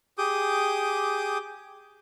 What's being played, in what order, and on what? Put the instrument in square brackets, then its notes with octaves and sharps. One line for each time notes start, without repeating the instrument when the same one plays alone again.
[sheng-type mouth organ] G4 G#4 D6 D#6 G6